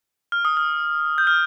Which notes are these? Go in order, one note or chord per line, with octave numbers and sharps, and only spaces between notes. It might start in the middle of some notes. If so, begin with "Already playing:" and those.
F6
D#6
F6
G6
F6